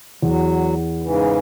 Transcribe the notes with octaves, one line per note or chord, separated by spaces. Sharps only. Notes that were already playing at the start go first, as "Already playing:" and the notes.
E2 F#3
G#2 C#3 E3